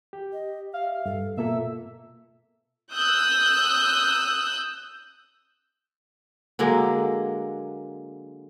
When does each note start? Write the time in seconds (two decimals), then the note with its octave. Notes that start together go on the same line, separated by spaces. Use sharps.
0.13 G4
0.33 D#5
0.74 E5 F5
1.06 G2 A4
1.37 B2 A#3 F4 A4 E5
2.92 D#6 E6 F#6 G6
6.59 D3 F#3 G#3 A#3